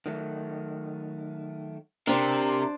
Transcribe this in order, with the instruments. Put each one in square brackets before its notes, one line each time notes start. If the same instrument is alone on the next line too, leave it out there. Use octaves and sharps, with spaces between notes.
[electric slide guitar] D#3 F#3 A3
[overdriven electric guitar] C3 [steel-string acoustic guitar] D4 C5 [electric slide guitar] A#4